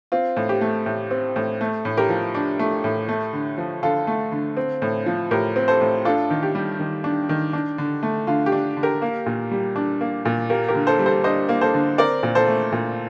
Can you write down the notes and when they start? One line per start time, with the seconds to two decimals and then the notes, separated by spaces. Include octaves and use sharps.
0.12 C4 F4
0.36 A2
0.49 G4
0.61 A3
0.86 A2
1.11 C4
1.36 A2
1.61 A3
1.85 A2
1.97 G4 A#4
2.10 F3
2.34 D4
2.59 A3
2.84 A2
3.09 A3
3.33 D3
3.58 F3
3.83 D3 F4 A4
4.07 A3
4.32 D3
4.57 C4
4.82 A2
5.06 F3
5.31 A2 G4 A#4
5.56 C4
5.68 A4 C5
5.81 A2
6.05 D4 F4 A4
6.30 D#3
6.43 G4
6.55 G3
6.80 D#3
7.04 D4
7.29 D#3
7.53 D4
7.78 D3
8.03 A3
8.27 D3 F4
8.46 G4
8.52 D4
8.77 D3
8.83 G4 A#4
9.02 A#3
9.26 A#2
9.51 G3
9.76 D4
10.01 A#3
10.25 A#2
10.50 A#3 G4 A#4
10.68 G4 A#4
10.75 D3
10.87 A4 C5
10.99 G3
11.06 A4 C5
11.24 D4 C5 D#5
11.49 A#3
11.61 A4 C5
11.74 D3
11.98 C4 A#4 D5
12.23 A#2
12.35 A4 C5
12.48 A3
12.72 A#2